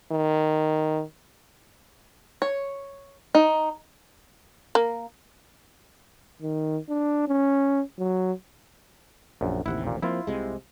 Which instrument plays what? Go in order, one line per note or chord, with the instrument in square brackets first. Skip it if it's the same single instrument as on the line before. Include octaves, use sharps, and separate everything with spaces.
[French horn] D#3
[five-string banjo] C#5
D#4
[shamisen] A#3
[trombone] D#3
D4
C#4
F#3
[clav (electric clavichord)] A#1 F#2
[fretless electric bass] A1 D#2 C3 [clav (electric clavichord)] E4 F#5
[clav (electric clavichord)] A#2
[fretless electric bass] F3 A#3 C4 [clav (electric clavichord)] E4 F4
[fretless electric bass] C2 C3 G#3